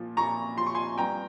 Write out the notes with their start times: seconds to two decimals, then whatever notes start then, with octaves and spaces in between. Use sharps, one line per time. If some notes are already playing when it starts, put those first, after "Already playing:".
Already playing: A#2 F3
0.17 A#2 A#5 C#6
0.57 F3 C6
0.67 C#6
0.75 G#5 C6
0.98 G2 G5 A#5